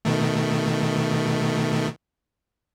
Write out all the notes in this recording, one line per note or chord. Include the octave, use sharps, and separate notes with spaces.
B2 D#3 A3